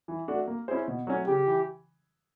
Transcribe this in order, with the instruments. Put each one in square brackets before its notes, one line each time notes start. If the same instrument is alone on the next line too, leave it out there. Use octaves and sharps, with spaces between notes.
[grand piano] E3
A3 D4 F#4
A#3
C#4 E4 G#4 C5
B2
F#3 A3 C#4
[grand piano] C#3 [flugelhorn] G4
[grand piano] E3